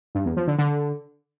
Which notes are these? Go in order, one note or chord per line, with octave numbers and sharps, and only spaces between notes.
G2
E2
F3
D3
D3